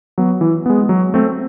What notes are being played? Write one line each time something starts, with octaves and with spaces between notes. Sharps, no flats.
F#3 B3
E3
G#3 B3
F#3
A3 C4